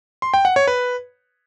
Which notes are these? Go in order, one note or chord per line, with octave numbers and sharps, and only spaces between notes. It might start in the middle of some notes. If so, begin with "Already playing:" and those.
C6
G5
F#5
C#5
B4